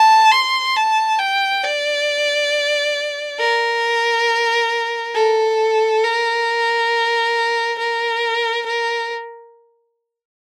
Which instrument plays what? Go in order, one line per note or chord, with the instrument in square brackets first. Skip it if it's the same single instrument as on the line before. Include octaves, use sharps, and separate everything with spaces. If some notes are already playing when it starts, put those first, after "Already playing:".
Already playing: [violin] A5
C6
A5
G5
D5
A#4
A4
A#4
A#4
A#4